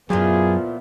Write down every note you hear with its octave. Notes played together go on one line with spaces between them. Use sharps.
F#2 A#2 F3 F#3 B3 E4 F4 G#4